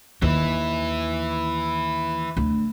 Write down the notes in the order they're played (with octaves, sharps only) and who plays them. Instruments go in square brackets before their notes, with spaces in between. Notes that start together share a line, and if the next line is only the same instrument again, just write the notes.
[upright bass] D#2 [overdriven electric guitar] E3 E4
[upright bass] D2